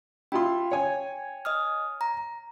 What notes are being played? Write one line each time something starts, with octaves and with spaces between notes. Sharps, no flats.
E4 F4 G5 C6
C#5 G#5
D#5 D#6 F6
A#5